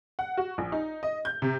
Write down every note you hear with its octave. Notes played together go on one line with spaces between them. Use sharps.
F#5
F#4
A#1
D#4
D#5
G6
C3